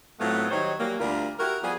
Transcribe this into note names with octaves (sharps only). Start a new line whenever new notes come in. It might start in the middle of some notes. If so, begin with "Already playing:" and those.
A2 F#3 A3 B3 C4 F4
D#3 F#3 G3 D#4 C5 C#5
E3 F#3 G3 A#3
D2 G3 F4 A#4
E4 F#4 G4 A#4
F3 G3 B3 G#4